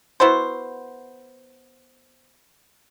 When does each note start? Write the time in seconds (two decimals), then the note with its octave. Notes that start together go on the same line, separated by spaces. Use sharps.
0.20 B3 E4 F#4 C5